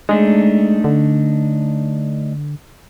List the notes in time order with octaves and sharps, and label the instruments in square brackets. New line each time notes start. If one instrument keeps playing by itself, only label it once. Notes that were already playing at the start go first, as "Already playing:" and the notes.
[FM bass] G#3 [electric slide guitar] A3 D4 D#4
[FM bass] D3